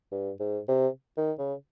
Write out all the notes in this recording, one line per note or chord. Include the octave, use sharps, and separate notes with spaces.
G2
G#2
C3
D#3
C#3